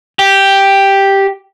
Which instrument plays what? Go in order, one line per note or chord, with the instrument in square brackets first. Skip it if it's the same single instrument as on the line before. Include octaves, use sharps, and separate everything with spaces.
[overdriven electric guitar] G4